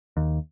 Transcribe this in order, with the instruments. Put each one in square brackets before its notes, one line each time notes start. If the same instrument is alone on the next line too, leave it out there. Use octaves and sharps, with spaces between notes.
[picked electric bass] D#2